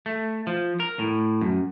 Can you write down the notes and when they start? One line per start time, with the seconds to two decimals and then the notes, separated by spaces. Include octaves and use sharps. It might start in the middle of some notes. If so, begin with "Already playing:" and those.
0.06 A3
0.47 F3
0.80 A#4
0.99 A2
1.41 F#2